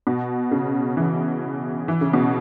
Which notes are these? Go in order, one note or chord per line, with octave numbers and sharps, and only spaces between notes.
B2
C#3
E3
E3
C#3
B2